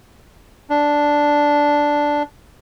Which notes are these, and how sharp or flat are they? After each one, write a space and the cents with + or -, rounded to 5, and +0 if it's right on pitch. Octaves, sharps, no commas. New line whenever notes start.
D4 -5